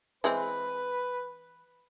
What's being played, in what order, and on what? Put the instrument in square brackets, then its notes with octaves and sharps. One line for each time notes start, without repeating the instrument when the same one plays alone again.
[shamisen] E3 G#3 C4 [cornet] B4